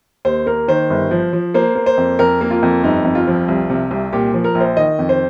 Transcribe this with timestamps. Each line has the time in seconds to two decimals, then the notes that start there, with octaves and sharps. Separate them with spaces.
0.25 D#2 C5
0.46 A#3 A#4
0.68 D#3 C5
0.90 G1
1.11 F3
1.33 F3
1.54 A#3 C5
1.75 A#3
1.86 C5
1.97 F2
2.19 F2 A#4
2.41 A#3
2.51 F4
2.63 F2
2.83 G1 D#4
3.05 F2
3.15 F4
3.27 F3
3.48 C2
3.70 C3
3.91 C2
4.12 A#2 G4
4.34 F3
4.44 A#4
4.55 A#1
4.60 C5
4.77 D#3 D#5
4.99 F2
5.09 C5